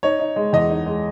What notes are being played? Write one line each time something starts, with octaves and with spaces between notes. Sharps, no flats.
D#4 C#5
D#4
G#3
E2 D#5
D#4
G#3